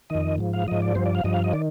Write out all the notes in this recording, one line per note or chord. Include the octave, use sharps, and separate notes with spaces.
F2 D#3 D#5
G#2 F3
F5
G#2 F3 D#5
D5
G2 F3 C5
D5
F5
G2 F3 D#5
F5
D#5
D#3 D5